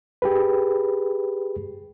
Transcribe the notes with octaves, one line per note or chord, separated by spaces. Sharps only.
G4 G#4 B4